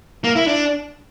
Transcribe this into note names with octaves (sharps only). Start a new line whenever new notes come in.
A#3
E4
D4